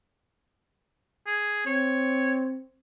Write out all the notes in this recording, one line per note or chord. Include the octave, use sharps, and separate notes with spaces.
G#4
C4 C#5